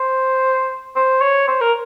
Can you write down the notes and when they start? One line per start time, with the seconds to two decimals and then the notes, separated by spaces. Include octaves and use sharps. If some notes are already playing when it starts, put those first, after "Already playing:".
Already playing: C5
0.96 C5
1.22 C#5
1.48 C5
1.61 A#4